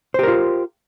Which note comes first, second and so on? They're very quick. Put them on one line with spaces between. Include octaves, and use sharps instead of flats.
C5 G4 A#4 F4